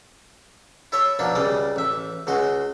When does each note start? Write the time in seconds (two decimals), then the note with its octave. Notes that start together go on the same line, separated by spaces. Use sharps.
0.92 E4 A4 C#5 E5
1.19 B2 F3 A#3 D4 B5
1.35 C#2 C#3 G3 D5 D#6
1.76 A1 E5
2.27 C#2 G#3 F#4 C6